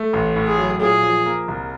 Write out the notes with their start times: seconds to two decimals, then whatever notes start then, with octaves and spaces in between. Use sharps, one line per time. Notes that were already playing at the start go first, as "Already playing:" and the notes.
Already playing: A3
0.13 A1
0.36 A2
0.47 G#4
0.58 F#3
0.81 A#2 G#4
1.03 F3
1.26 A#3
1.48 C2